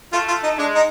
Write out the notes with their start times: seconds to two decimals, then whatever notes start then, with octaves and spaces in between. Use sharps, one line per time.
0.13 A3 F4
0.28 F4
0.43 D#4
0.58 G#3 D4
0.75 D#4